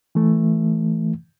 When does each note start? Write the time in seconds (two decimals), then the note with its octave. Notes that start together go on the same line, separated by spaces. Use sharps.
0.15 E3 A3